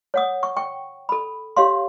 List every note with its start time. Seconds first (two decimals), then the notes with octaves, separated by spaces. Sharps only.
0.14 C#5 F#5 D#6
0.43 C#6
0.57 G5 C#6
1.09 A4 B5
1.57 G4 C#5 F5 C6